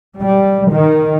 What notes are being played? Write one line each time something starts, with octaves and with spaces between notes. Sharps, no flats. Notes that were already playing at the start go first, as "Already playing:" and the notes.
G3
D#3